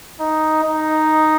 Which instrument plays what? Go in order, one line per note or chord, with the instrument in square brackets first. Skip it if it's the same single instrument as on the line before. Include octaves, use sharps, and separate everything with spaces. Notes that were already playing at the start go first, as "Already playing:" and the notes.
[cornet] D#4
D#4